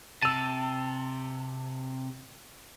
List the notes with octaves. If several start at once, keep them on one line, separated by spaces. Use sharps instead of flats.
C3 A5 E6 D#7